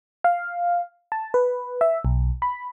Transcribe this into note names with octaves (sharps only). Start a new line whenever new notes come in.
F5
A5
B4
E5
B1
B5